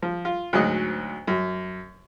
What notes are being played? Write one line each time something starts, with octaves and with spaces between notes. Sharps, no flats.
F3
F4
D2 G#2 F#3 D#5
F#2